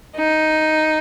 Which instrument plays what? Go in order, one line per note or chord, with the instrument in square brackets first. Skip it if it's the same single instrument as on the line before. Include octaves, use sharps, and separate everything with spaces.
[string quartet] D#4